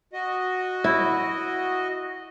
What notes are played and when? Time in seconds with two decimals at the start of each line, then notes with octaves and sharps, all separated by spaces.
0.13 F#4 D#5
0.84 E4